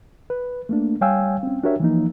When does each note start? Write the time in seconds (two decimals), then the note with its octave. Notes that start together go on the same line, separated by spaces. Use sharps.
0.30 B4
0.69 A3 A#3 D4
1.01 G3 C#5 F5 G5 G#5 E6
1.43 C4 C#4
1.63 D4 F#4 G4 A#4 C#5 E5
1.80 E3 F3 A#3 D#4